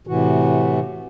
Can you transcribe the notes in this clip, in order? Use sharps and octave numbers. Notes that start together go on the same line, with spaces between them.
A2 C3 E3 F#4